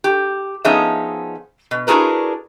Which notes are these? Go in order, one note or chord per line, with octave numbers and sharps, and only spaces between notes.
G4
F3 B3 C#4 D#4 G#4 E5
B2
D4 E4 F#4 G#4 A#4 B4